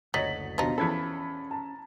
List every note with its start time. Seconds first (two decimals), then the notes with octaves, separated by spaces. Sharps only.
0.14 F#1 D2 F#3 C#5 D#5 A6 B6 F#7
0.58 F#1 D#2 B2 F3 D4 D#4
0.78 E2 C#4 A4 B5 G#6 B6
1.51 A5 A#5